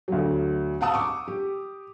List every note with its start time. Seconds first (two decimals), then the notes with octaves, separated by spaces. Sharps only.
0.08 D2 F#3
0.81 F5 F#5 A5 D#6 E6
0.94 C#6 D6
1.28 G4